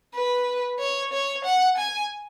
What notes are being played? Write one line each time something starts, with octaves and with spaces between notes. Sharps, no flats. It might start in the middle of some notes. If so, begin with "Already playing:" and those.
B4
C#5
C#5
F#5
G#5